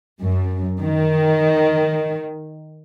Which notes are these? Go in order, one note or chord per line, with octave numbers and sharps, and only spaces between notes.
F#2
D#3